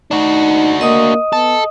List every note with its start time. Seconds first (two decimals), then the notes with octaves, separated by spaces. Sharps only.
0.11 D4 D#4 F#4
0.81 A#3 D#5 D#6
1.33 B3 A4